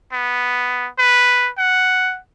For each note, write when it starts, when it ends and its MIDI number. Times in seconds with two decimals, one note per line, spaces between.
0.12 0.88 59
0.98 1.50 71
1.58 2.19 78